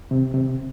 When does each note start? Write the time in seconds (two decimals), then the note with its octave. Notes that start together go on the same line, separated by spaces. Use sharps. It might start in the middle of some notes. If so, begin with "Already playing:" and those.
0.11 C3
0.34 C3